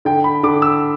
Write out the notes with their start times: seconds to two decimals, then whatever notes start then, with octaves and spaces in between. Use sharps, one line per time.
0.05 D3 G5
0.24 B5
0.43 D3 D6
0.62 E6